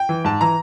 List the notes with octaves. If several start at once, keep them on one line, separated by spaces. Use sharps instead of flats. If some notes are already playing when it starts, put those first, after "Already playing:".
Already playing: G5
E3
G#2 A5
E3 A#5